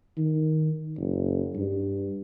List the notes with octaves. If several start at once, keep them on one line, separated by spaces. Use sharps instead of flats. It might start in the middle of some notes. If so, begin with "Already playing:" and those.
D#3
F#1
G2